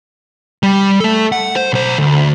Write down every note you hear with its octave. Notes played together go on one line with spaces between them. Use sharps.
G3
A3 A4
F#5
C5
B1 C5
D2